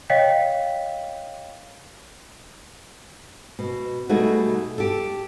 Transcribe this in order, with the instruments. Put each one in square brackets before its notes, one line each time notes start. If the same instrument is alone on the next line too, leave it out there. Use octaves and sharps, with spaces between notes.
[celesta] C#5 D#5 F5 G5 B6
[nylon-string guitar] B2
B2 G3 A3 D#4 F#4 G#4
G4 A4